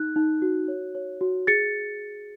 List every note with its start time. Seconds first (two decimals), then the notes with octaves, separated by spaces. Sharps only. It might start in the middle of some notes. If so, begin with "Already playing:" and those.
Already playing: D#4 F#6
0.16 D#4
0.42 F#4
0.68 C#5
0.95 C#5
1.21 F#4
1.47 G#4 A6 C#7